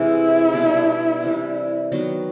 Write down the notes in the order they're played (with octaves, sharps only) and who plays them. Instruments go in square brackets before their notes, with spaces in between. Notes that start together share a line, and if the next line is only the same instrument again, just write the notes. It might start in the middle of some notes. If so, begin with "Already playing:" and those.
Already playing: [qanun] C3 E3 G#3 [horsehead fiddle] E4
[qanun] B2 G3 B3 D4
C3 E3 G3
D#3 F#3 B3